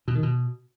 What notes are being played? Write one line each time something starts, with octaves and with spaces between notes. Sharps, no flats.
B2
D#3
B2